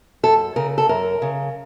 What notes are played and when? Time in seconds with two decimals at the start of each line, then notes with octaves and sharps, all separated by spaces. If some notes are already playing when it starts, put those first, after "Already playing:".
0.23 F#2 A4
0.56 C#3 A#4
0.78 A4
0.89 F#2 A#4
1.22 C#3